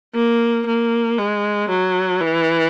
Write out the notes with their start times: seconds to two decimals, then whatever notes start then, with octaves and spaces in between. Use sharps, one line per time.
0.14 A#3
0.66 A#3
1.18 G#3
1.69 F#3
2.21 E3